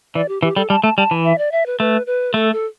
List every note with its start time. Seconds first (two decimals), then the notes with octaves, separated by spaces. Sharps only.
0.15 E3 D5
0.28 G4
0.43 E3 G4
0.56 G3 A4
0.70 G3 A5
0.84 A3 A5
0.98 G3 A5
1.11 E3
1.25 E5
1.38 D5
1.52 E5
1.66 B4
1.80 A3 B4
2.06 B4
2.34 A3 A4
2.52 A4